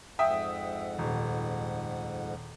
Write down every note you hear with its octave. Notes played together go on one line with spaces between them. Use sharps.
F2 G#2 E5 F#5 G5 D#6
D#1